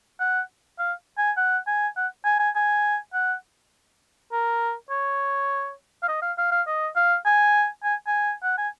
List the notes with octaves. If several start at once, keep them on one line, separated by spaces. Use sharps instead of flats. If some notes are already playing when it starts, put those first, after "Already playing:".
F#5
F5
G#5
F#5
G#5
F#5
G#5
G#5
G#5
F#5
A#4
C#5
F5
D#5
F5
F5
F5
D#5
F5
G#5
G#5
G#5
F#5
G#5